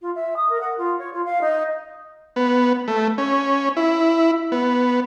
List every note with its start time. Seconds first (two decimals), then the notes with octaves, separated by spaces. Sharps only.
0.02 F4
0.15 E5
0.37 D#6
0.50 A#4
0.61 F#5
0.78 F4
0.99 C#5
1.13 F4
1.25 F5
1.41 D#4
2.36 B3
2.88 A3
3.18 C#4
3.77 E4
4.52 B3